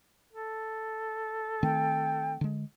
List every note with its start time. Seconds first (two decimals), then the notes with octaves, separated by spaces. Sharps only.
0.32 A4
1.63 D#3 A3 C4 G5
2.41 D3 G#3